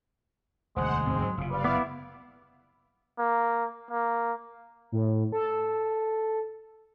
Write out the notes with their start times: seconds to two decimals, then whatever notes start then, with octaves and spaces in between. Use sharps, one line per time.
0.76 E1 D2 G#3 C5 F#5
1.06 E1 D2 G#2 C4
1.22 F#3
1.38 F#1 C3 F4
1.51 G3 B4 D5 F5
1.64 B3 E4 D6
3.19 A#3
3.91 A#3
4.92 A2
5.32 A4